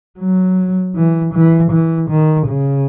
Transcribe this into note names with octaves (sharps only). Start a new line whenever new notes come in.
F#3
E3
E3
E3
D#3
C#3